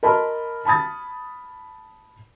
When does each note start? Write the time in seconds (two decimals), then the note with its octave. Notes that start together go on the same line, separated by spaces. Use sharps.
0.03 A#4 D#5 A5 B5 C6 F6
0.65 A5 B5 D#6 A6